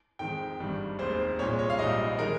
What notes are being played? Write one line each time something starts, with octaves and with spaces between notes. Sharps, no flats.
F2 D#3 G#3 G5
G#1 G2 D#3 G3
F1 D#2 D#3 G#3 C5
C2 A#2 G#3 C#5
C#5
F5
A#1 G#2 G3 D#5
D#3 G#3 A#4